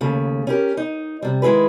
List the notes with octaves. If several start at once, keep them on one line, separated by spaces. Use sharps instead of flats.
D#2 C#3 A3
C#4 G4 A#4
D#4
C3 G3
D#3 G#3 E4 G#4 B4